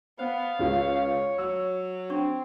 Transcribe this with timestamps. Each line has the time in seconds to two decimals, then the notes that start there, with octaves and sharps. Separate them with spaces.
0.19 B3 C5 F5
0.59 C#2 G#3 F4 C#5
1.38 F#3 E6
2.10 C4 D4 C#6